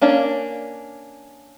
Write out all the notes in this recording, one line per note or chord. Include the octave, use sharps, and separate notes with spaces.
A#3 C#4 D4